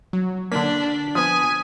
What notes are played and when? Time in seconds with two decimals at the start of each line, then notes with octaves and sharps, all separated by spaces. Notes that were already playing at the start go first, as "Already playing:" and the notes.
0.13 F#3
0.52 D3 A#3 D4 B6
1.15 F3 B3 G#5 D#6